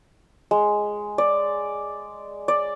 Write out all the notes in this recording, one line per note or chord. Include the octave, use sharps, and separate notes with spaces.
G#3
D5
D5